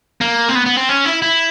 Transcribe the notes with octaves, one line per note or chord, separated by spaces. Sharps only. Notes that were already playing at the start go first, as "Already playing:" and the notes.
A#3
C4
B3
B3
C4
C#4
E4
E4